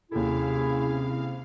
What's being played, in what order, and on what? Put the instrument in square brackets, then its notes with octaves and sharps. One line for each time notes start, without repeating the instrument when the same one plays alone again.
[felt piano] D#2 A4 [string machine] C3 F5 [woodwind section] C#4 E4 [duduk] G#4